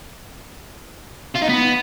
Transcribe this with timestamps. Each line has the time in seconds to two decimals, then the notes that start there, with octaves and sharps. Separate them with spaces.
1.35 F4
1.42 D#4
1.49 B3